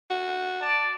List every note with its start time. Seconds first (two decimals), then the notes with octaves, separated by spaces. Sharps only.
0.11 F#4
0.61 D5 A5